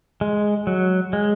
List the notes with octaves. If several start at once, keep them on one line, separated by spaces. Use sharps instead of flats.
G#3
F#3
G#3